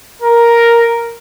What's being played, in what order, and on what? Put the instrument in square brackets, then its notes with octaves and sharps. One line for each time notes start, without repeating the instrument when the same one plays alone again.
[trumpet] A#4